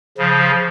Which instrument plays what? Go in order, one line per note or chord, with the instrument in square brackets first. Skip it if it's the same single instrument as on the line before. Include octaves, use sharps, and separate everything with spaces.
[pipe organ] C#3 F3